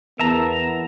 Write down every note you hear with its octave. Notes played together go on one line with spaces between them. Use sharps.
E2 B3 A#4 E5 A5 A#5